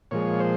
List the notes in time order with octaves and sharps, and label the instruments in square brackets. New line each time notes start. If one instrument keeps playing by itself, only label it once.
[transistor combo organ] A#2 F3 G#3 C#5
C5